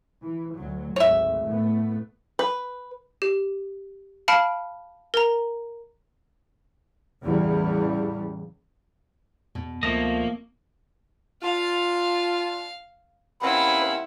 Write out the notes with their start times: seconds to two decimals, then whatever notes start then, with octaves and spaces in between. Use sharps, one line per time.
0.23 E3
0.54 D2 F#3
0.96 G#1 D2 C#5 E5
1.44 A2 A3 B3
2.39 B4
3.22 G4
4.28 F5 A5 B5 F6 C#7 D7
5.14 A#4 A#5
7.21 A1 E2 C#3 E3 G3
9.55 E2 B2
9.83 C#2 F3 A3 A#3 D#5
11.43 D4 F4 F5
13.41 D#2 C4 C#4 E4 B4 F#5